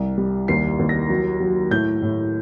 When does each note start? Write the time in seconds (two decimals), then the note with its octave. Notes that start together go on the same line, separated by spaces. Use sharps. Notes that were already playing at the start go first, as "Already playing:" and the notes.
Already playing: C2
0.18 G3
0.48 D#2 C7
0.79 D#2
0.89 A#6
1.10 F#3
1.40 F#3
1.71 A2 G6
2.02 A2